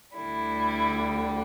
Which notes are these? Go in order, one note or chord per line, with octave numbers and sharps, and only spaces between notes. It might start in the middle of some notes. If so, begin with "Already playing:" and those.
D2 D3 G3 E4